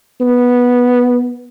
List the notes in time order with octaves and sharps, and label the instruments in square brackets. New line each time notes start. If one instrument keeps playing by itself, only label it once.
[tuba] B3